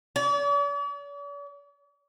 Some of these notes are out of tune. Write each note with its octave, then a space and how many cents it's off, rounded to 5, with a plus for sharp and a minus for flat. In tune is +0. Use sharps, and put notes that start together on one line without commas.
D5 -45